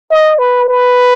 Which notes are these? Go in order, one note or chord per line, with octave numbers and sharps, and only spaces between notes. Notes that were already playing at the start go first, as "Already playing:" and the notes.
D#5
B4
B4